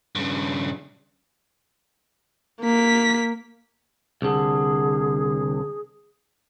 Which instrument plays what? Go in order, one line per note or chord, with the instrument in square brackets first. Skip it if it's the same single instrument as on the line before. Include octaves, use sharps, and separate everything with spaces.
[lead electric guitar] G2 C#3
[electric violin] A#3 B6
[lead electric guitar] C2 D3 [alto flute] G#4